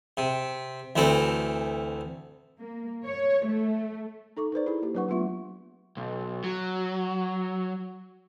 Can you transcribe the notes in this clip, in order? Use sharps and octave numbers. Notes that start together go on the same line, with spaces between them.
C3
D2 E3 C4 A4
A#3
C#5
A3
D#4 A4 C#6 D6
D#4 B4 C5 D5
E4 G#4
A#3 E4 G4
F#3 D4 B4 F#5 C#6
F#3 A3 B3 F4 E5 C#6
B1
F#3